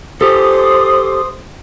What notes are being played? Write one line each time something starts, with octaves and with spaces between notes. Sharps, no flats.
G4 A4 C5 C6 D6 D#6